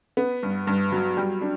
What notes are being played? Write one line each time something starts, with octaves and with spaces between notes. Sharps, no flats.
B3
G2
G2
F#3
G3
D4